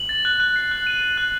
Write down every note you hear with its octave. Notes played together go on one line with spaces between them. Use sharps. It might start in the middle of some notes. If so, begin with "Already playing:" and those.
Already playing: F#7
A6
F#6
F#6
C7
F#6
D#7
A6
F#6